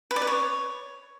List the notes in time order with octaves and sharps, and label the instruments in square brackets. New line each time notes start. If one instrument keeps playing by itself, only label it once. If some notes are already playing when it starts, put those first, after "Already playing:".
[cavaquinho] B4
D5
B4
C#5